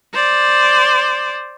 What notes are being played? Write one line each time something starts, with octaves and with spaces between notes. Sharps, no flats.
C5 D5